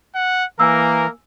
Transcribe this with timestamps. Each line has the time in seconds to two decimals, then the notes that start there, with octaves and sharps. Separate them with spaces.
0.15 F#5
0.60 E3 A#3 A#4 G#5 E6